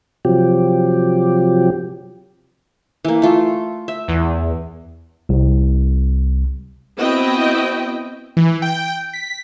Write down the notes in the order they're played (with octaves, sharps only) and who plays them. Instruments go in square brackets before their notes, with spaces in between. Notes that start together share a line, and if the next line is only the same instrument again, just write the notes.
[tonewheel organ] C3 F3 F#3 G4
[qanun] E3 A#3
A3 F4
E5
[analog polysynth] E2
[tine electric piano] C2
[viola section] B3 C4 E4 F#4 D#5 G5
[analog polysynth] E3
G5
B6